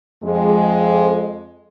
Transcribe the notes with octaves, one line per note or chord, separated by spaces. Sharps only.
F2 G#3